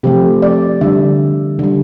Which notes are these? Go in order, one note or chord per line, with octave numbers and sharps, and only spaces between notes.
C3 F3 A3 G4
D5
D3 G3 E5
D3 G3